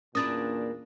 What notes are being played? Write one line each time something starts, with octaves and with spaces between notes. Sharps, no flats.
E2 A#2 A#3 C#4 D4 B4 D#6 A6